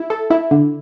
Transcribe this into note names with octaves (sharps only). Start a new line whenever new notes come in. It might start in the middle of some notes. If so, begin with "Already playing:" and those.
Already playing: E4
A4
E4
D3